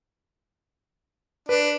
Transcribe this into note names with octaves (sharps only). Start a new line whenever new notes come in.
D4 B4